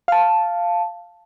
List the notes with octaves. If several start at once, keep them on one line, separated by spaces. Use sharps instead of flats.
F5 A5